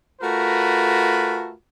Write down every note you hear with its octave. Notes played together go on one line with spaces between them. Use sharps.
A3 F4 F#4 A#4 B4